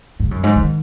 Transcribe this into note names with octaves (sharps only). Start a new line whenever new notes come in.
G#2
F#2
G#2
D#3